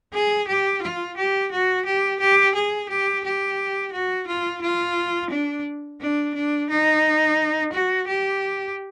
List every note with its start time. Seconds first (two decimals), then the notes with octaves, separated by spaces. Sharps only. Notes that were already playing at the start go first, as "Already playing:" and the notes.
0.13 G#4
0.47 G4
0.82 F4
1.17 G4
1.51 F#4
1.85 G4
2.20 G4
2.54 G#4
2.89 G4
3.24 G4
3.92 F#4
4.27 F4
4.61 F4
5.30 D4
6.00 D4
6.35 D4
6.70 D#4
7.72 F#4
8.08 G4